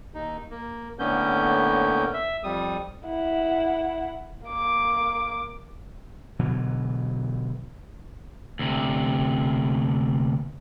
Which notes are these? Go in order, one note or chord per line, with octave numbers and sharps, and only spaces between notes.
D#2 D#4
A#3
A2 D3 A#3 B3 C#4 G6
E5
F2 G3 D#6
E4 F#5
A#3 D6
B2 D3 E3 F#3
D2 C3